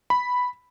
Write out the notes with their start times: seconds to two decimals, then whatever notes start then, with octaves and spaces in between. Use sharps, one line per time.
0.10 B5